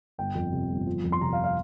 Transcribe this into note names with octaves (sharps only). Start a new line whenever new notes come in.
G1 G5
F2
C3
G1
F3
F2
C6
C3 A#5
F5
F5